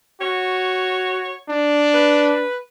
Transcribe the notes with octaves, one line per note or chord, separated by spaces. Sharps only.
F#4 C#5
D4
B4